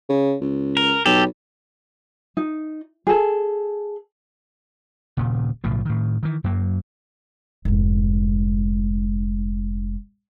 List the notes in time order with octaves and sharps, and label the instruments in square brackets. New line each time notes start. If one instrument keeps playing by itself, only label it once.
[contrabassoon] C#3
C#2
[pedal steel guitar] A#4
[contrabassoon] B1 [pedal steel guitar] G4 A4
[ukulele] D#4
G#4 A4
[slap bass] D#1 A#2 C#3
B1 A2 C#3 F3
A2 D#3
D#3 E3
F#2 F#3 A#3
[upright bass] F1 G#2